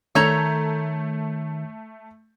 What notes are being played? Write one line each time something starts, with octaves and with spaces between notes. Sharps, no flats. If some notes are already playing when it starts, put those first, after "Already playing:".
D#3 A3 A4 C#5 A#5 G6 F7